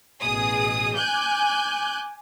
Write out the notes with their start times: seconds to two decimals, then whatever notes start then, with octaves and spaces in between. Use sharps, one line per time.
0.22 A1 B2 G#4 D#6
0.97 G#5 D6 F#6 G6